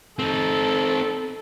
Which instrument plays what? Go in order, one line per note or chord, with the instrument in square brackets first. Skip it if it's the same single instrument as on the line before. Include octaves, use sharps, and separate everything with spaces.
[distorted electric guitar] C4 D#4 [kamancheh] A4